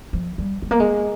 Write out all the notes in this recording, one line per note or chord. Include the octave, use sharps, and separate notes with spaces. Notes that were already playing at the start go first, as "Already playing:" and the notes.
F3
G3
G#3
A#3
G#3